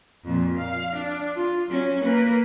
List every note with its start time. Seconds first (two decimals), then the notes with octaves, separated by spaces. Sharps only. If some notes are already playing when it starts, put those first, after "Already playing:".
0.25 F2 A#2
0.57 F5
0.96 D4
1.35 F4
1.67 F#3 C#4
2.03 A#3 B4